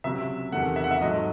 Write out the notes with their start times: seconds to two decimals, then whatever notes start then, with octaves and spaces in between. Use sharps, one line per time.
0.04 C#2 C3 F#3 E5
0.52 E2 C3 D#3 A3 F#5
0.76 E5
0.84 F#5
0.91 E5
1.01 G#2 F#3 A3 D#5